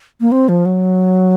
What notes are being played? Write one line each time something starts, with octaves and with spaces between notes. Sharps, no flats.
A#3
C4
F3
F#3